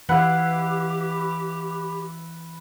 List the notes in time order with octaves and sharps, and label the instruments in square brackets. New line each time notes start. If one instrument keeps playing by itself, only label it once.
[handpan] E3 F5 [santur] E4 B4 [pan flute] G4 [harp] F#5